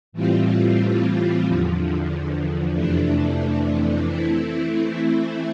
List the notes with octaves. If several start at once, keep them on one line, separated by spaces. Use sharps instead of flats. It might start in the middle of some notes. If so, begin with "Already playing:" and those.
A2 E3 G3 C4 F4
E2 D3 F3
F2 C3 E3 A3 D4
E3 A3 C4 E4